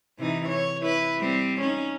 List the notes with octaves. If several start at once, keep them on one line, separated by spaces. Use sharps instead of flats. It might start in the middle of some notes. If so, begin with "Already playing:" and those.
C3 E3 D#4
C#5
E4 B4
G3 C4
C#4 D#4